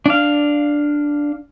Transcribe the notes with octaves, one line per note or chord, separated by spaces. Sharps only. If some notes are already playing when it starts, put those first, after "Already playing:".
D4 F5